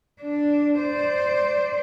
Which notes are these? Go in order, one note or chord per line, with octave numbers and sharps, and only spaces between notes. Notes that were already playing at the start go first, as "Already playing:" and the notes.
D4
C5 D5